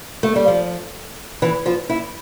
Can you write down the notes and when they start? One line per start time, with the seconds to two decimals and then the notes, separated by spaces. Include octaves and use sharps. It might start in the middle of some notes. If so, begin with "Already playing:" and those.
0.23 A3
0.36 G3
0.48 F3
1.42 E3
1.66 F3
1.89 E4